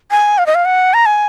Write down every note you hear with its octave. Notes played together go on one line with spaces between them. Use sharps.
G#5
F5
D#5
F5
F#5
A#5
G#5